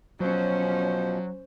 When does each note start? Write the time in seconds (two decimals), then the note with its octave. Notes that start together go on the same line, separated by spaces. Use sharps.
0.20 B2 F3 F#3 C#4 C5